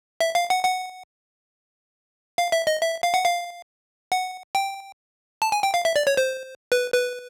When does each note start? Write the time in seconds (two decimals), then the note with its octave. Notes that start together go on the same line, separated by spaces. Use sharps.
0.20 E5
0.35 F5
0.50 F#5
0.65 F#5
2.38 F5
2.52 E5
2.67 D#5
2.81 E5
3.03 F5
3.14 F#5
3.25 F5
4.12 F#5
4.55 G5
5.42 A5
5.52 G#5
5.63 G5
5.74 F5
5.85 E5
5.96 D5
6.07 C#5
6.17 C5
6.72 B4
6.93 B4